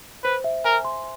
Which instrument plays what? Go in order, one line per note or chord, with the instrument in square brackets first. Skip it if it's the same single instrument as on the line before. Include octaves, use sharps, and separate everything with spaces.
[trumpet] B4 [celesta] C5
[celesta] E5
[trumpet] A#4 [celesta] G#5
[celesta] C6